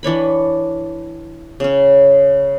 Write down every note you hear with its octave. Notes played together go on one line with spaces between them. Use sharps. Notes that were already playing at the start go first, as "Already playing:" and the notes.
E3 D4 C#5 B5
C#3 C#4